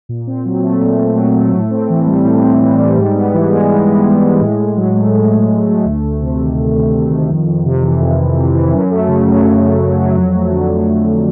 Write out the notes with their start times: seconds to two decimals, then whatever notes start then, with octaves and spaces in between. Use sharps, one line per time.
0.09 A#2
0.27 C4
0.45 F#3
0.63 A3
0.81 A#2
0.98 C4
1.16 F#3
1.36 A3
1.53 A2
1.70 C4
1.89 E3
2.07 G3
2.25 A2
2.43 C4
2.61 E3
2.78 G3
2.97 G#2
3.15 B3
3.33 E3
3.51 G#3
3.68 G#2
3.87 B3
4.04 E3
4.23 G#3
4.41 A2
4.59 A2
4.76 F#3
4.95 A3
5.12 A2
5.31 A2
5.49 F#3
5.67 A3
5.85 D2
6.03 D2
6.21 C3
6.39 D#3
6.57 D2
6.75 D2
6.92 C3
7.10 D#3
7.29 F2
7.46 F2
7.65 C3
7.83 E3
8.01 F2
8.19 F2
8.37 C3
8.54 E3
8.73 F#2
8.90 A3
9.08 C#3
9.27 F#3
9.44 F#2
9.62 A3
9.81 C#3
9.99 F#3
10.17 F2
10.35 A3
10.52 D3
10.71 F#3
10.89 F2
11.06 A3